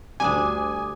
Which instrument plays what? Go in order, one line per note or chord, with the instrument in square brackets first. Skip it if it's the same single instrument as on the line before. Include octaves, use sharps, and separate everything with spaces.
[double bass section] D2 [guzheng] G3 D4 [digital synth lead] G#5 [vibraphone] D6 D#6